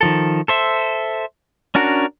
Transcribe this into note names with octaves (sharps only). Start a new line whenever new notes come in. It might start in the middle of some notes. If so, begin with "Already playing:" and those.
D#3 F3 A4
A4 C5 E5
C#4 D4 F#4 A#4